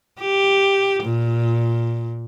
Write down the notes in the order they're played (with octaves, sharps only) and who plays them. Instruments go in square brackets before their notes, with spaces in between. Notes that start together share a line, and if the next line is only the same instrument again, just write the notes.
[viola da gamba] G4
A#2